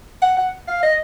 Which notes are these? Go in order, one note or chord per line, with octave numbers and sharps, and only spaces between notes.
F#5
F#5
F5
D#5